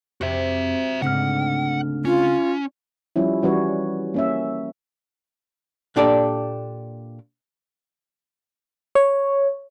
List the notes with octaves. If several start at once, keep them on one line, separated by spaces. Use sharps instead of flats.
F2 C3 F#4 E5
D2 G#2 C#3 C4 F#5 F6
C#4 F4
F3 G3 C#4 E4
E3 G3 C#4 F#4 B4 C#5
A#3 C#4 E5
A#2 D4 G4 A4 D5
C#5